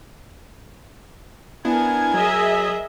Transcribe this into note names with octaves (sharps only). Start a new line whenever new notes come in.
B3 D4 E4 A#4 G#5 G#6
F#3 G#4 D#5 E5